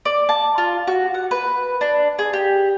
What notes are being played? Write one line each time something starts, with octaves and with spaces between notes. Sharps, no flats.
D5
A5
F4
F#4
F#5
B4
D4
G#4
G4